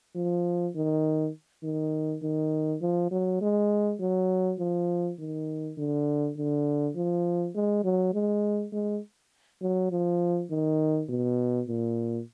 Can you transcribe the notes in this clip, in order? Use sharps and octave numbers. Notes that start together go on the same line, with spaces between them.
F3
D#3
D#3
D#3
F3
F#3
G#3
F#3
F3
D#3
D3
D3
F3
G#3
F#3
G#3
G#3
F#3
F3
D#3
B2
A#2